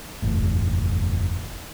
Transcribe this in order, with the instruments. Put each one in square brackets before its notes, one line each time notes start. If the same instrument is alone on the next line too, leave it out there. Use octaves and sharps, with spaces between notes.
[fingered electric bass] F#1 E2 A2